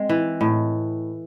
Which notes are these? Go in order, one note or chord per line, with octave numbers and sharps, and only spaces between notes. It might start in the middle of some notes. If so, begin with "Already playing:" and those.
Already playing: G#3 C4
E3
A2